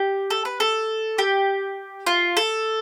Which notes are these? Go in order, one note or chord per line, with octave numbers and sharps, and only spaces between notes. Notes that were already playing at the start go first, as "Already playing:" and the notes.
Already playing: G4
A4
B4
A4
G4
F4
A4